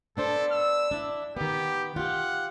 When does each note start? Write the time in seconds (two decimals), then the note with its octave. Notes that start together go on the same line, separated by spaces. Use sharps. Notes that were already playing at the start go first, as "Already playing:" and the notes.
0.17 B3 D4 A4 C5
0.52 E6
0.91 D4 E4
1.37 D#3 B3 G4
1.96 F4 G4 F#5